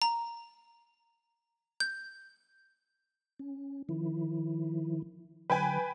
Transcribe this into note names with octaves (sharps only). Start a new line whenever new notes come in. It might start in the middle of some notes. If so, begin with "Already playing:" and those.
A#5
G6
C#4
D#3 F3 E4
D3 F#3 B4 G5 G#5